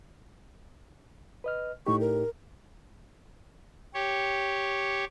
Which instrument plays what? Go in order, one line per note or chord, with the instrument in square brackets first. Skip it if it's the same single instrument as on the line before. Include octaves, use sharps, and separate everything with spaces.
[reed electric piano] B4 D#5 F6
[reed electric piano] A2 D#4 G4 [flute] C#6
[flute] A#4
[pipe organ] G4 C#5